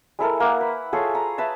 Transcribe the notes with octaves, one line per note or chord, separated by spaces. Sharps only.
G#3 E4 A4 A#4
A#3 F#5
B4
F4 G#4 A4 C#5
A#5
B4 E5 A5